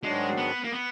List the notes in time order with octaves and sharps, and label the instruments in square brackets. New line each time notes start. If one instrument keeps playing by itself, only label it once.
[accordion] G#2 D#3 F#3 D4 F#4 [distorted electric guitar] G#3
[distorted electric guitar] B3
A#3
B3